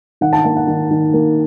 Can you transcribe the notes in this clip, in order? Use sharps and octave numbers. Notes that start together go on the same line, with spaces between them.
D#3 F#5
A5
A#3 F#5
F#5
D#3
D#3
A#3